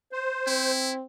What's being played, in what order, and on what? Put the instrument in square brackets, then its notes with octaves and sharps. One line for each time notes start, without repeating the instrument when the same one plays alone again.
[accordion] C5
[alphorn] C4 [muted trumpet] E4